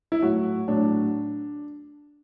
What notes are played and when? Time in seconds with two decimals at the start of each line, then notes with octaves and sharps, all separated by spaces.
0.12 E4
0.22 A2 F#3 F#4
0.68 A2 F#3 D4